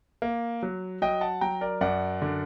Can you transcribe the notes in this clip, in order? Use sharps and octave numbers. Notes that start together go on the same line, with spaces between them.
A#3
F#3
F#3 D#5 G5
F#5 A5
F#3 G5 A#5
A#4 D5
F#2 D5 F#5
D3